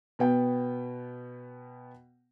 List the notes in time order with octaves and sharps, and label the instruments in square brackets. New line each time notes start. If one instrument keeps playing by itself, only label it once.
[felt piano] B2 B3 G5